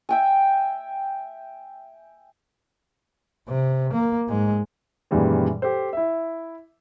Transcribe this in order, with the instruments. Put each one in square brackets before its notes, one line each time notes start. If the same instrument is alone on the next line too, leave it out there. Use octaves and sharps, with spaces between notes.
[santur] E5 G5 G#5
[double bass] C3
A#3
G#2 G#3
[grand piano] F#2 A#2 D#3 E3 G3 G#3
G4 A4 C5
E4 E5